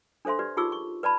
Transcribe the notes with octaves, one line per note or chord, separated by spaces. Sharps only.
D4 A4 C5 E5 C6
G4 B4 D5
D#4 F4 G4 G#4 C#6 E6
C#6
B4 D5 A5 B5